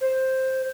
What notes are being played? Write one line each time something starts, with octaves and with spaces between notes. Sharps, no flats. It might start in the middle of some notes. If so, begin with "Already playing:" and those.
C5